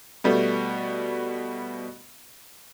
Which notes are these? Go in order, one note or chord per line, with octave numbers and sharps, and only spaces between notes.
B2 G3 A3 B3